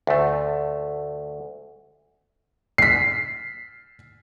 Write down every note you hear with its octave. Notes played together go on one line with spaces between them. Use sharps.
D2 A3
B6 C7